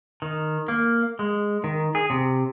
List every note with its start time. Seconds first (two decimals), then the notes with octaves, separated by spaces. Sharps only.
0.22 D#3
0.68 A#3
1.19 G#3
1.64 D#3
1.95 G#4
2.10 C3